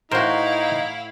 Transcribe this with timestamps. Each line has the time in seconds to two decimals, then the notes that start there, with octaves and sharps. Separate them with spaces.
0.11 A2 D#4 E4 F#4 A#4 C5 F5